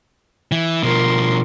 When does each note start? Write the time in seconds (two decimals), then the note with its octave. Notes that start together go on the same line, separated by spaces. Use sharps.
0.52 E3
0.83 B2 F3 A#4 C6